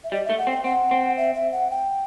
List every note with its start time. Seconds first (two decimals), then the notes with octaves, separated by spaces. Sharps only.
0.04 E5
0.12 G3 D#5
0.25 A3 E5
0.38 F#5
0.47 C4
0.51 G5
0.64 C4 F#5
0.91 C4
1.17 E5
1.34 E5
1.52 F#5
1.70 G5